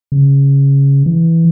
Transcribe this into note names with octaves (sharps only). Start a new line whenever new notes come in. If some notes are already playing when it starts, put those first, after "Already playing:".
C#3
E3